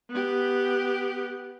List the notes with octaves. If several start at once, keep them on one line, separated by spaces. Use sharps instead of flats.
B3 G4